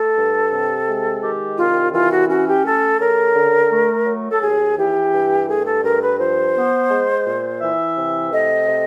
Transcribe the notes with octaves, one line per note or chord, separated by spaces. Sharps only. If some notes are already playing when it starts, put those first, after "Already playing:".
Already playing: A3 A4
G2
C3
G#3
D#3 G4
C2 F4
E3 F4
F#4
C#4 F#4
G4
A3 A4
C#3 A#4
D3
A3
F#3
A4
D#2 G#4
E3 G4
G2
A3 G#4
A4
G2 A#4
B4
F3 C5
B3
G#3
A#2
E3 E5
C3
A3 D#5
C3